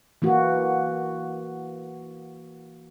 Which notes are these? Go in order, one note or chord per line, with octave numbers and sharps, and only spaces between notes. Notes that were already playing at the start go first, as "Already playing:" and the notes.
E3 A#3 F#4